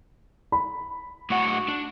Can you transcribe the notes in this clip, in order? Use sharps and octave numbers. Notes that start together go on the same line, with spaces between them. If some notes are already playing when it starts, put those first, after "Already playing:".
B5
A2 F#4 F#5
D4